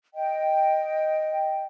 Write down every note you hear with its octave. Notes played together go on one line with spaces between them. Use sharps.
D#5 G5